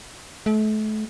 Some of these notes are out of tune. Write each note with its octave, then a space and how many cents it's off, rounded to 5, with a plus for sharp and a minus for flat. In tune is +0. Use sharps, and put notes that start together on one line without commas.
A3 -35